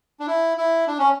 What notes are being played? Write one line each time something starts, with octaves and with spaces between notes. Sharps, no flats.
D4
E4
E4
D4
C#4